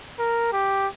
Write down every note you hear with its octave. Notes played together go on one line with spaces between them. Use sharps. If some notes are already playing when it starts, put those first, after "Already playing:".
A#4
G4